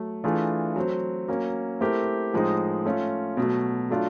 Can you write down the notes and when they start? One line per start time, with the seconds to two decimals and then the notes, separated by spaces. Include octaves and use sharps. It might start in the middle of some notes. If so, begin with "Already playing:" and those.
Already playing: F#3 A3
0.24 E3 A3 D4 F4 G#4
0.76 F#3 A3 C4
1.28 F#3 A#3 C#4
1.80 A3 C4 E4 G4 A#4
2.33 A2 F3 G#3 C4 D#4
2.85 A3 C#4 F4
3.37 B2 F#3 A3
3.90 F#3 A3 D4 F4